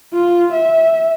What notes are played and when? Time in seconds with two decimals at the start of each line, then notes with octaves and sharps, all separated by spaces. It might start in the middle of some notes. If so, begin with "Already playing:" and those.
0.13 F4
0.53 E5